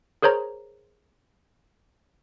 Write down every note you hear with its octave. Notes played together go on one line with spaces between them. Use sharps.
G#4 A#4 C5 C#5 A#5